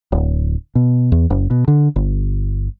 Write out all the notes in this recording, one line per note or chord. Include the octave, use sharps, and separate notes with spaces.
D1
B2
E2
F#1
B2
D3
G1